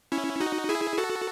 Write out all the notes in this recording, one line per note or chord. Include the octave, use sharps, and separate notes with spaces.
C#4 E4
D#4 F#4
E4 G#4
F#4 A4